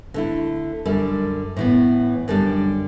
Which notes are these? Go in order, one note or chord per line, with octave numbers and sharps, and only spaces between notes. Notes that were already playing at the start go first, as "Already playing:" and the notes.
D3 A3 E4
F#2 D3 G3
A2 E3 B3
F#2 D3 G3 D4